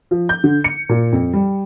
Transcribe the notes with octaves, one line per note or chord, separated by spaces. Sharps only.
F3
G6
D3
C#7
A#2
F2
G3